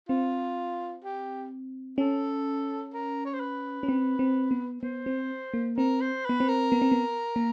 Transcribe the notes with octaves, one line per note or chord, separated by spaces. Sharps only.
C4 F4
G4
C#4 A4
A#4
C#5
C5
B4
C#4
C4
C4
B3
B3 C5
C4
A#3
C4 A#4
C5
B3 B4
C4
A#4
B3
C4
B3
A#3